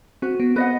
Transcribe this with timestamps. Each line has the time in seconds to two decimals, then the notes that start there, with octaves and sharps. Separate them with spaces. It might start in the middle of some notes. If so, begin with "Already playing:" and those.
0.22 C4 F#4
0.40 B3
0.56 C4 B4 D#5 F#5